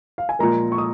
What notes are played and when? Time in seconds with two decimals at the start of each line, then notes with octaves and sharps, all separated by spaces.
0.18 F5
0.29 G#5
0.39 A#2 F3 G#3 A#4 A#5
0.72 C#6
0.78 D#6